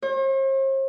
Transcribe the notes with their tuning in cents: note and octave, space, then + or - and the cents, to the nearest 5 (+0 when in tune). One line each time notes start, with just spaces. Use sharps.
C5 +45